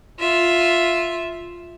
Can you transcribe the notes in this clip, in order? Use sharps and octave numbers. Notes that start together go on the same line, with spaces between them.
F4 E5